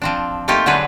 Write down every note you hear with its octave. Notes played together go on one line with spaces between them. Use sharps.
F3 C4 D4
A3 A#3 C4 D#4 F4 G4
D3 F#3 G3 D4 G#4 B4